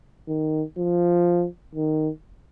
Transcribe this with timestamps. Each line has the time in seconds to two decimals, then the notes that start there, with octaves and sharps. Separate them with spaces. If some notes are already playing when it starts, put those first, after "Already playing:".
0.28 D#3
0.78 F3
1.75 D#3